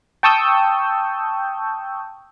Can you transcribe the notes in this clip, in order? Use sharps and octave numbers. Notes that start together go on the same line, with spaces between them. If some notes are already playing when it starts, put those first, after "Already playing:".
G5 A5 C#6 D#6 E6 G6